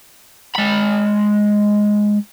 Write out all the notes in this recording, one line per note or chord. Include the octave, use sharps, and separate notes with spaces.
G#3 B5